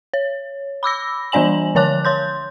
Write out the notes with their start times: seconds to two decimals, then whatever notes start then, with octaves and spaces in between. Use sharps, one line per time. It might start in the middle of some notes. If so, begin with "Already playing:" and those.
0.14 C#5
0.83 B5 D6 E6 A#6
1.32 E3 G3 D4 D5 G#5 F#7
1.75 D3 F3 C#5 A5 D6 F#6
2.05 C#5 C6 G6